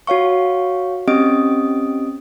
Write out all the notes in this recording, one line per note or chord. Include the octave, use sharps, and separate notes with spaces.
F#4 C#5 F5 C#6
C4 C#4 G4 D#5 D#6 D7